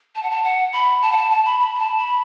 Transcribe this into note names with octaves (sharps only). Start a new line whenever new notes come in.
A5
F#5
A5
F#5
B5
A5
F#5
A5
A5
B5
B5
B5
A5
B5